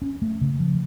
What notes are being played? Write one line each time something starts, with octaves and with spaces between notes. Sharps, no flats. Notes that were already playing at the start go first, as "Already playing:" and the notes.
C#4
A3
C#3
F3